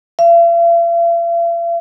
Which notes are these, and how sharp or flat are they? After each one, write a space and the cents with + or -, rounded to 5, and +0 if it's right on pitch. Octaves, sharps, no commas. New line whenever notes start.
F5 -45